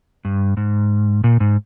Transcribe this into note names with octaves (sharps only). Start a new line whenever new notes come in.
G2
G#2
A#2
G#2